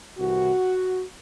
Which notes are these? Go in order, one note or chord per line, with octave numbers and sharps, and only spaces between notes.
C2 C3 E3 F#4